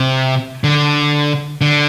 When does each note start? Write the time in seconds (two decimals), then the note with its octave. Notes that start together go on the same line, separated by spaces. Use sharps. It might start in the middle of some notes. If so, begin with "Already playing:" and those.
Already playing: C3
0.64 D3
1.61 D3